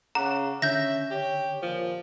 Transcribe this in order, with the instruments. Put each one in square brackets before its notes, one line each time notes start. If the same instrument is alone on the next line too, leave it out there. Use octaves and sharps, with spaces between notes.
[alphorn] C#3 [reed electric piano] F#5 D6 F#6 [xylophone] A#5
[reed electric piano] D3 [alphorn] C#4 [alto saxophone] E5 [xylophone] G6 A#6
[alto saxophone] G4 [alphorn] C#5
[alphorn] A#2 [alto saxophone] F3